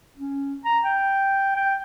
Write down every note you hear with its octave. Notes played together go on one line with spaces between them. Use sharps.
C#4
A#5
G5
G5